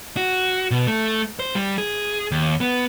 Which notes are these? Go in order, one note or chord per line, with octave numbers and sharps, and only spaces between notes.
F#4
B2
A3
C5
G3
G#4
D#2
B3